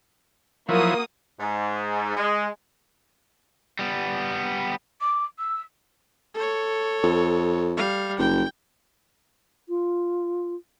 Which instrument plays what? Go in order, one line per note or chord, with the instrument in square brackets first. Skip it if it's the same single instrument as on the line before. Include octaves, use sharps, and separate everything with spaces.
[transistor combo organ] F3 F#3 E4 [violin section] A#3 F#4 D#6
[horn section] G#2
G#3
[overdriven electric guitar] G3 B3
[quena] D6
E6
[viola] A4 C#5
[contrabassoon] F2
[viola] G3 F5
[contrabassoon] F#1 [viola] G5
[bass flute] F4